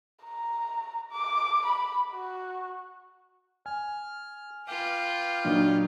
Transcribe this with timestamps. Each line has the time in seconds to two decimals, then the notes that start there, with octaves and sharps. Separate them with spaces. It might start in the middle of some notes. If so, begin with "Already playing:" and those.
0.24 A#5
1.11 D6
1.66 B5
2.13 F#4
3.66 G#5 F6
4.68 F4 B4 G5 D6 F6
5.45 A#2 F#3 D4 D#4